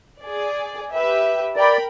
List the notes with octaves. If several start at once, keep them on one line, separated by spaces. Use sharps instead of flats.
G#4 D5
G4 B4 E5
A#4 D5 G5 B5